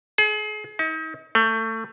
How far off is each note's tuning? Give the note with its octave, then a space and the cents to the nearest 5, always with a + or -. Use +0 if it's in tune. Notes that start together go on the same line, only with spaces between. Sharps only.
G#4 +35
D#4 +40
A3 +25